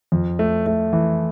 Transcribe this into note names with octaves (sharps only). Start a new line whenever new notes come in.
F2
A3
A3
E3